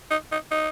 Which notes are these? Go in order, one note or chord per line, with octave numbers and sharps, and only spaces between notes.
D#4
D#4
D#4